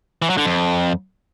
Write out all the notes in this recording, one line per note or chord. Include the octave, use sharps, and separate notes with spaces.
E3
F#3
D3
F2